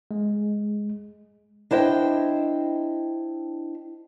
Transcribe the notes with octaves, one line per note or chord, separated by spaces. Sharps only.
G#3
D4 E4 C5 D#5 G5